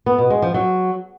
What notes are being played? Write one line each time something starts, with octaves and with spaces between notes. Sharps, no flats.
B3
B2
G#3
F3
F#3